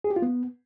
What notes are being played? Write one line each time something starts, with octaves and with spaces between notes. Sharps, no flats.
G#4
G4
F4
B3